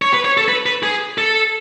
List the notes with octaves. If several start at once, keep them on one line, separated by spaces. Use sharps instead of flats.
C#5
B4
C#5
A4
B4
B4
G#4
A4